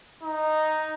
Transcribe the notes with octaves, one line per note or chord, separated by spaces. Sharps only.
D#4